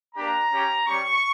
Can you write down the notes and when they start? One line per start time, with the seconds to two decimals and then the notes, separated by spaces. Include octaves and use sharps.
0.15 A#3 D4 G4 A#5
0.52 C#4 G4
0.86 G3 C#4 G4 C#6